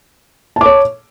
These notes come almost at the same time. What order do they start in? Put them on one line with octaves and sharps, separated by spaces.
A5 D6 C#5